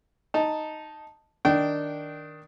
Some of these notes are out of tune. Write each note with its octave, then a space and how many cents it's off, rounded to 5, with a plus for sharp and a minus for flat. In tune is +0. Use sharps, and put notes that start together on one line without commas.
D#4 +0 A5 +0
D#3 +0 D4 +0 G5 -20